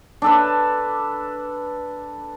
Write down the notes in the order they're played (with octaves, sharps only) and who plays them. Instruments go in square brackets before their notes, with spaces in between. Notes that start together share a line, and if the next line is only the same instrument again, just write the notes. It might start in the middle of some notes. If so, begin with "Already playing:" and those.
[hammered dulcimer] D4 A4 B4